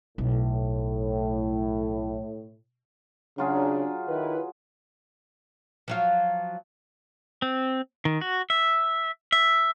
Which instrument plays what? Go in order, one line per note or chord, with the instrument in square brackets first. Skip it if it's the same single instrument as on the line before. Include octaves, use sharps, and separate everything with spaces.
[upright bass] B1 [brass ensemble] A2
[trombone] C#3 [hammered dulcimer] F#3 F4 G#4 [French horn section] D4
[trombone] D#3 [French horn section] E4 B4
[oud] F3 F#3 F4
[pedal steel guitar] C4
D#3
F#4
E5
E5